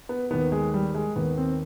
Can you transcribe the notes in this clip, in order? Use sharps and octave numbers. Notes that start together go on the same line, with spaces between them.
B3
D#2 D#3 B3
G#3
G3
G#3
D#2 D#3 B3
C4